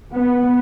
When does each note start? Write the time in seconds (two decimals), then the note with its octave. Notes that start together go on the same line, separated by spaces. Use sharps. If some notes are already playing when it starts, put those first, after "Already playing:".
0.13 B3